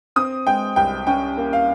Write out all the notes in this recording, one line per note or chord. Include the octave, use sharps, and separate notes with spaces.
C4 D#6
G#3 G5
C2 G5
C#4 G5
A#3
F5